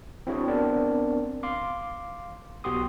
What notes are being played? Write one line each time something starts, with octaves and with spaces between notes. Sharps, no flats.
C4 D4 E4 F#4 G#4 C#5
B3 C4 D4 A#4 D5
F5 C6 D6
B1 B3 F#4 G4 C6 D#6